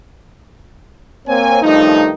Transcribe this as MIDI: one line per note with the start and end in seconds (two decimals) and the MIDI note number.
1.27 1.60 58
1.27 1.60 60
1.27 1.60 73
1.27 1.60 80
1.62 2.10 43
1.62 2.10 51
1.62 2.10 53
1.62 2.10 57
1.62 2.10 63